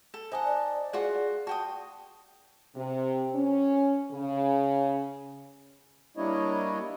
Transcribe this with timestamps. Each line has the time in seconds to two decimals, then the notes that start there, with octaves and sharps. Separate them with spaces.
0.14 A4
0.31 D#4 C5 D#5 F#5 G#5 A5
0.45 D5
0.93 F4 F#4 G#4 F#5
1.47 F#4 G5 A5 D#6
2.75 C3
3.35 C#4
4.12 C#3
6.17 G3 A#3 D4 E4 C#5 D#5